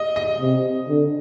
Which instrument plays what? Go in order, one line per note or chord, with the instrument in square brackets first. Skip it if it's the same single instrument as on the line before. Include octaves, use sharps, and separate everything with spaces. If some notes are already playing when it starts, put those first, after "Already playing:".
Already playing: [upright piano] D#5
D#5
[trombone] C3
D3